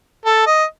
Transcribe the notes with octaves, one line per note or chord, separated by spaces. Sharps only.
A4
D#5